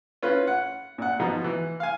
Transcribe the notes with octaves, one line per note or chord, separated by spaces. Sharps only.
C#4 E4 F4 B4
F#5
A#2 F#5
B2 F3 D#4
E3
F5 G#5